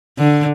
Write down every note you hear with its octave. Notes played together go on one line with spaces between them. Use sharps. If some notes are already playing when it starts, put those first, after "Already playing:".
D3